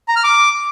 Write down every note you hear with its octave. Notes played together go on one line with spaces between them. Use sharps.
A#5
F6
D6